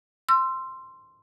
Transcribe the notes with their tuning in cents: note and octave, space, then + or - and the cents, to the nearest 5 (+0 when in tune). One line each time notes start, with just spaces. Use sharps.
C6 +0 E6 +30